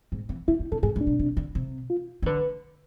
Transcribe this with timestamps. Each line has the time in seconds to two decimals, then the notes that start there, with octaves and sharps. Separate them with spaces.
0.12 G#2
0.29 E3
0.48 E3 E4
0.59 D3
0.72 D3 A4
0.83 G#2 G#4
0.96 G#2
1.01 D4
1.07 B2
1.19 C3
1.37 D3
1.55 C3
1.90 F4
2.22 E3
2.26 D3 B4